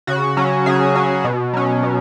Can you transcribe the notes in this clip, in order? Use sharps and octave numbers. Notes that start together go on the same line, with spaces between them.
C#3 F#4
F#3 C#4
C#3 G#4
F#3 C#4
B2
F#3 C#4
B2